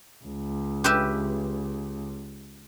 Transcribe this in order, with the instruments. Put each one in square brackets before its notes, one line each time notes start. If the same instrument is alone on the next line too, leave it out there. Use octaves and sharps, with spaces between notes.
[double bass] C#2
[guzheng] G4 B4 E5